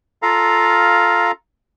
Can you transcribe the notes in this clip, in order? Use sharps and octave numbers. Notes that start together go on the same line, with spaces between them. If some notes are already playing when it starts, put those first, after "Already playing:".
F4 A4 F5 A#5